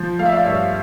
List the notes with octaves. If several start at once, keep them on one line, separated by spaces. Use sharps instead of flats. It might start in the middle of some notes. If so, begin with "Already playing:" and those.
Already playing: F3
A3 F5
E5
D5 F5
G2 C#5 E5